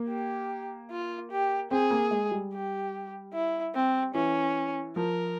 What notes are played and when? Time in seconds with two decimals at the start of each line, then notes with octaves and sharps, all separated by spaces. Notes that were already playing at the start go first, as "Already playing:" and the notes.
Already playing: A#3
0.08 G4
0.90 F4
1.31 G4
1.71 C4 G#4
1.91 A#3
2.11 G#3
2.31 G3
2.53 G4
3.33 E4
3.74 C4
4.14 E3 C#4
4.96 F3 A#4